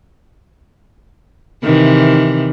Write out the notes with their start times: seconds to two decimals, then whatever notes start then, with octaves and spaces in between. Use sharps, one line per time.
1.63 C3 D#3 E3